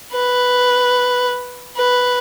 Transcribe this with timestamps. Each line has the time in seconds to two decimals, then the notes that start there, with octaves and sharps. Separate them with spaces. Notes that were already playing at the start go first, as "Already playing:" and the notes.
0.13 B4
1.76 B4